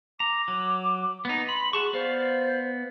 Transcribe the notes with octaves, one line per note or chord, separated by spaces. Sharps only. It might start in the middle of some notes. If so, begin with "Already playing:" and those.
A#5 D6
F#3
B3 D#4
B5 C6
F#4 G#4 A5 C#6
B3 C5 D5 F5